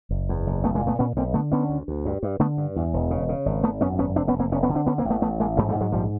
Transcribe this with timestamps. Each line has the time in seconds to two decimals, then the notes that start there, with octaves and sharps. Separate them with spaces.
0.11 F#1
0.29 E2
0.47 F#1
0.64 B1 A3 B3
0.75 G#3 A#3
0.81 A#2
0.87 A3 B3
0.99 A#2 B3 C#4
1.16 B1 A#3 C4
1.34 D3 A3 B3
1.52 D3 B3 C#4
1.69 D2
1.88 D2
2.06 G2
2.23 G2
2.39 D3 A3 B3
2.58 G2
2.76 E2
2.93 E1
3.11 C#3
3.29 C#3
3.46 G#1
3.63 G#1 A3 B3
3.81 F#2 B3 C#4
3.98 G#1 B3 C#4
4.16 F1 C4 D4
4.28 B3 C#4
4.34 F1
4.40 A#3 C4
4.52 F1 B3 C#4
4.63 B3 C#4
4.69 D3
4.75 C4 D4
4.86 D3 B3 C#4
4.98 A#3 C4
5.05 A1
5.10 A3 B3
5.22 A1 A3 B3
5.40 A1 G#3 A#3
5.57 G#2 G3 A3
5.69 G3 A3
5.75 G#2
5.81 F#3 G#3
5.92 A#1 F3 G3